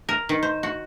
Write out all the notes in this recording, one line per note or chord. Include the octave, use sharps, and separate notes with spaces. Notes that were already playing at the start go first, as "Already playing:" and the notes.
A#4
D#3
C5
F#4